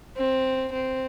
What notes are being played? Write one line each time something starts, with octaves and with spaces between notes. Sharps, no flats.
C4
C4